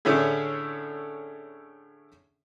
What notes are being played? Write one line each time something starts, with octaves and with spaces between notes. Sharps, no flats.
A2 D3 A3 C#4 E4 G#4